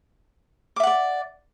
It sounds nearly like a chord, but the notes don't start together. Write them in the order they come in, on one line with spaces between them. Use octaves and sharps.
D6 E5 F#5 D5